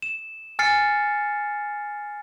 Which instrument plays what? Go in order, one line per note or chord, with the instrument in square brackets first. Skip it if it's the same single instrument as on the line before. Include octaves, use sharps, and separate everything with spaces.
[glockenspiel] E7
G#5 F6 A6 C7 C#7